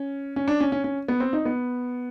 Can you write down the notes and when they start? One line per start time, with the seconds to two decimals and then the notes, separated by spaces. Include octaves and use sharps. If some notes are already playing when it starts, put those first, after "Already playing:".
Already playing: C#4
0.36 C#4
0.48 D4
0.60 C#4
0.72 C#4
0.84 C#4
1.08 B3
1.20 C4
1.33 D#4
1.45 B3